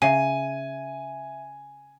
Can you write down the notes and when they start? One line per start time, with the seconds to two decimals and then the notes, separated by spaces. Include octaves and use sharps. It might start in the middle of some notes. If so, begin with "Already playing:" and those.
0.02 C#3 E5 G#5 D#7